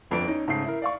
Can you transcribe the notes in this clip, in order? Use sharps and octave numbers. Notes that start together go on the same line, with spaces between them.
G1 F2 B3 D4 D7
C#4 D#4
G#2 C#3 A3 C7
E4 A#4
D5 F5 C#6